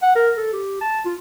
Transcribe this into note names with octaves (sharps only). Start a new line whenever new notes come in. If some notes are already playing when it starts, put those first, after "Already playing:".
F#5
A#4
A4
G4
A5
F4